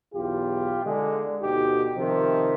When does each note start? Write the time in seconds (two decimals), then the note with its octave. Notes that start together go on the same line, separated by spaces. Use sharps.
0.14 B1 E2 F4 G4
0.86 D3 G#3
1.42 D2 B2 D#4 G4
1.97 C3 D#3 F3